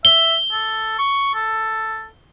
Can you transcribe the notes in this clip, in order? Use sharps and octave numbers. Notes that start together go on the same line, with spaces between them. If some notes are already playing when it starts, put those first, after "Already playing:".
E5 G7
A4
C#6
A4